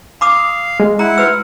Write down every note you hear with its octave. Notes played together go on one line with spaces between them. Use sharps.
F5 B5 D6 D#6
G#3
E4 F#5 A#5
F#4 B4 E6